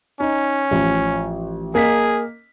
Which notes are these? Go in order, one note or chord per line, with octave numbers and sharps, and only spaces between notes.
C#4 D#4
A1 F3
A#3 G#4 D#5 B6